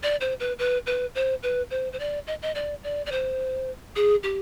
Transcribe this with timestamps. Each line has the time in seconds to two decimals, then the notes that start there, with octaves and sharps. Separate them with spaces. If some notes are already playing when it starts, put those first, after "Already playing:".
0.03 D5
0.21 C5
0.40 B4
0.59 B4
0.86 B4
1.15 C5
1.43 B4
1.71 C5
1.93 C5
1.99 D5
2.27 D#5
2.42 D#5
2.55 D5
2.83 D5
3.06 D5
3.12 C5
3.96 G#4
4.23 G4